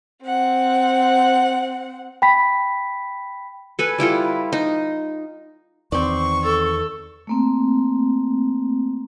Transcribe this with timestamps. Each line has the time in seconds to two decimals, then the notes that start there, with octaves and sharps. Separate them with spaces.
0.23 C4 F#5
2.22 G5 B5 B6
3.79 A4 B4 G#5
3.98 G3 E4 F4 A4
4.53 D#4
5.92 E2 D#3 C4 D5 C#6
6.43 A4
7.27 A3 A#3 C4